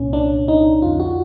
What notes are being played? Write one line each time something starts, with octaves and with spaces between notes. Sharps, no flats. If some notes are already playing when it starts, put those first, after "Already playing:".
Already playing: C2 A#2 C#4
D4
D#4
F2 D3 F4
F#4